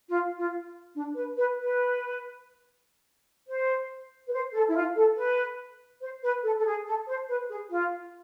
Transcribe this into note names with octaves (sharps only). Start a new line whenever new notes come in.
F4
F4
D4
B4
B4
B4
C5
B4
C5
A4
E4
F4
A4
B4
C5
B4
A4
A4
G#4
A4
C5
B4
G#4
F4